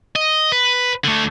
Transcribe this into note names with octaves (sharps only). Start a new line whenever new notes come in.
D#5
B4
D3 A3